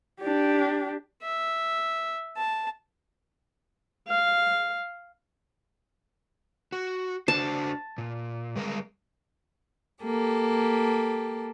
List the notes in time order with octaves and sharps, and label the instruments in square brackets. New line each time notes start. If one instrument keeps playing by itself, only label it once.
[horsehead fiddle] D4 G4
[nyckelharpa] E5
A5
[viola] F5
[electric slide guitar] F#4
[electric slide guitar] D4 F#4 C5 [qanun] A5
[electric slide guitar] A#2
G3 G#3 A#4
[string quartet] A#3 G4 A4